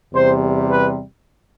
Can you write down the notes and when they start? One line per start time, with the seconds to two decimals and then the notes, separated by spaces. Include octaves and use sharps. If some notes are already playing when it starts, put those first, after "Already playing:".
0.12 E2 C3 G3 C5
0.68 B4